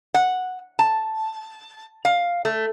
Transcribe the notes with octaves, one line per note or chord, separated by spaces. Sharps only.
F#5
A5
F5
A3